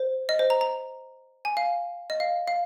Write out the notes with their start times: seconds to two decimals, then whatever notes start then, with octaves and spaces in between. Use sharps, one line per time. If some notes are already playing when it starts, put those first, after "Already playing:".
Already playing: C5
0.29 D#5
0.39 C5
0.50 A#5
0.61 A#5
1.45 G#5
1.57 F5
2.10 D#5
2.20 F5
2.48 F5